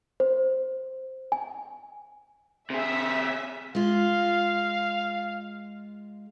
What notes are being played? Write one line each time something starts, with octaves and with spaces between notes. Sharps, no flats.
C5
G#5
C3 G#4 E5 B6
G#3 F4 F5